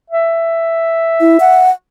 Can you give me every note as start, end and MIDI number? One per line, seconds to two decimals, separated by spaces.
0.10 1.69 76
1.21 1.37 64
1.40 1.70 78